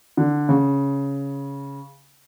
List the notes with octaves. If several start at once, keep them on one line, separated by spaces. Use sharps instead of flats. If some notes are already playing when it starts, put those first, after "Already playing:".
D3
C#3